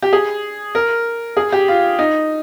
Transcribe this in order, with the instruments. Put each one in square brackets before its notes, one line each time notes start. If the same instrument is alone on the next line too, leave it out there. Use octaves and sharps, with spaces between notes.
[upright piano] G4
G#4
A#4
G#4
G4
F4
D#4